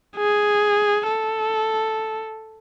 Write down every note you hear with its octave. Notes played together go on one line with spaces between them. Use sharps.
G#4
A4